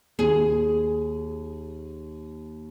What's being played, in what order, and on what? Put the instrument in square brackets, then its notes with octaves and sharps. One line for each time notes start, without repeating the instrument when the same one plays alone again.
[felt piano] D#2 [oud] G#4